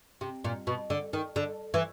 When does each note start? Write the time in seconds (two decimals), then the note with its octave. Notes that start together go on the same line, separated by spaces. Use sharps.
0.21 C3
0.44 A#2
0.67 B2
0.90 D3
1.13 D#3
1.36 D3
1.74 E3